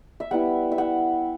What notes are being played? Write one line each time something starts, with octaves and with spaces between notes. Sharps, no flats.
E5
G3 B3 E4 F#5
E5
F#5